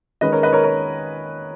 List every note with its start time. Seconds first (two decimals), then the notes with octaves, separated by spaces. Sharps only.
0.21 D#3 G#3 C#4 B4 D#5
0.32 A#4 C#5
0.43 B4 D#5
0.53 A#4 C#5
0.63 A#4 C#5